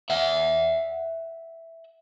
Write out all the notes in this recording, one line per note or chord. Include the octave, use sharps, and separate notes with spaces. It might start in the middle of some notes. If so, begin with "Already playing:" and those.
E5 F#5